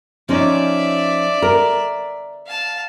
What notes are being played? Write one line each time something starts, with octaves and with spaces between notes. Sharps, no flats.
F3 C#4 D#4 D5 E5
A#4
F5 A5